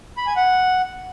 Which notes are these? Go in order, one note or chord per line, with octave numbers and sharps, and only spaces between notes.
B5
G#5
F#5